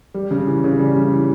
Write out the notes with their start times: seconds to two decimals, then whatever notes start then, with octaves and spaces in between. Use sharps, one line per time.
0.14 G3
0.31 C#3
0.48 E3
0.64 C#3
0.79 G3
0.96 C#3
1.13 E3